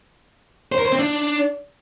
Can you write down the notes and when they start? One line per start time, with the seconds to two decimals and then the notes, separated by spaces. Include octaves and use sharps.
0.72 C5
0.79 A#4
0.86 C5
0.92 C4
0.99 D4